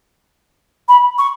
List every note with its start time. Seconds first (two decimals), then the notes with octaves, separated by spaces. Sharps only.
0.89 B5
1.18 C#6